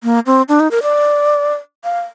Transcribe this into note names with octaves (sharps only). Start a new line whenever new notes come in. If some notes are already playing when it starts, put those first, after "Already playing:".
A#3
C4
D4
D#4
A#4
D5
F5